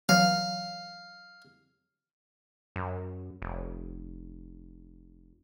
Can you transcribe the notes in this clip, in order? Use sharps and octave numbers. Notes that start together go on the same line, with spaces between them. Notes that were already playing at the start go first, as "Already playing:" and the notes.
E3 F#3 F5
F#2
F1